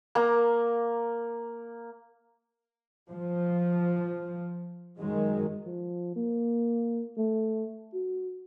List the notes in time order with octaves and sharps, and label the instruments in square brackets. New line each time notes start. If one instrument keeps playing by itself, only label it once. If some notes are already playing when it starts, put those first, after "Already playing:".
[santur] A#3 A#5
[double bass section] F3
F#2 D#3 G#3
[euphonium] F3
A#3
A3
F#4